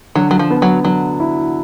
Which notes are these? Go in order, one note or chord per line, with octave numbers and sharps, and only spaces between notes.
D3 F#3
F#3
F3
B3
F#3
D3 F#3
E4